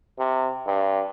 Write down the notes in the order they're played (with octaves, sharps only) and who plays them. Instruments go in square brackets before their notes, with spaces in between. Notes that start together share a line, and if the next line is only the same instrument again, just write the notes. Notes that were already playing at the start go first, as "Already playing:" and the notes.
[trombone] C3
G2